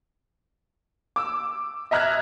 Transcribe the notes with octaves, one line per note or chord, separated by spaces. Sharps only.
D6 E6
D#5 E5 A#5 F6 F#6 G#6